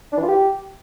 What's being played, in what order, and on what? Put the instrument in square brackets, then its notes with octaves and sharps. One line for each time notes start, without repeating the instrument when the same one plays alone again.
[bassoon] D4
E3
F4
G4